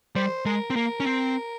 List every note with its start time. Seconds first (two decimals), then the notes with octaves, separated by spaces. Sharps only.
0.15 G3 C5
0.45 G#3 A#4
0.70 C4
0.76 A#3 A#4
1.00 C#4
1.06 C4